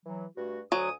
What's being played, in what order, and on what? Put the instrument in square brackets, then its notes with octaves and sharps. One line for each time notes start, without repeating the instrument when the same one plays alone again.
[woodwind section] E3 F#3
G2 A3 F#4
[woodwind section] D2 G#5 D#6 [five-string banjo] F#3